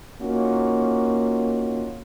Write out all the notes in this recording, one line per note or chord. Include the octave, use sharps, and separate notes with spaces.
A#3 C#4 D#4 F4 F#4